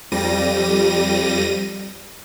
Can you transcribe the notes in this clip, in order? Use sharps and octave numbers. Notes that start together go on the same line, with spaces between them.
F2 G3 A#6 D#7